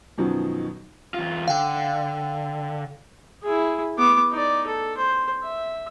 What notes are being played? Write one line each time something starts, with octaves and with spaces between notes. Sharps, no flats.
F#2 B2 D#3 F3 F#3
E2 F4
D3 F5 G5
E4 G#4
B3 D6
D#4 D5
A4
C5
E5